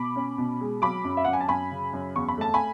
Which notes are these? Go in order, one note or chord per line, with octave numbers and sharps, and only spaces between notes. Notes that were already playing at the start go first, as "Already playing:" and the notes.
Already playing: B2 B5 D6
C#4
B2
G#3
F#3 B5 D6
F#2
E5
F#2 F#5
G#5
A5
F#2 G#5 B5
C#3
F#2
E2 C#6
B5
A3 A5
G#5 B5